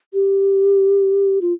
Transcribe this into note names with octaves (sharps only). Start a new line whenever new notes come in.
G4
F4